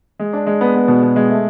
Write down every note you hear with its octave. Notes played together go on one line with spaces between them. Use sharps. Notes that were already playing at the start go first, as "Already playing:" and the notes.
G#3
D4
G#3
B3
B3
B2
B2
G#3
A3